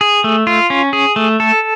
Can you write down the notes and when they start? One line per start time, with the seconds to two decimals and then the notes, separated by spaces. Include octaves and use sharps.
0.01 G#4
0.24 A3
0.47 F4
0.70 C#4
0.93 G#4
1.16 A3
1.40 A4